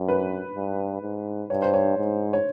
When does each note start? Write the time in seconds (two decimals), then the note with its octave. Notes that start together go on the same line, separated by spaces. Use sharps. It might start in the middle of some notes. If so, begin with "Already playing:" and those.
Already playing: F#2
0.08 B4
0.55 G2
1.02 G#2
1.50 G2 C#5
1.62 C5
1.74 C#5
1.97 G#2
2.33 C#5